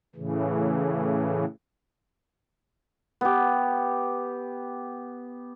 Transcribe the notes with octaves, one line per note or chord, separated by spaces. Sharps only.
A2 C#3 E3
B3 G4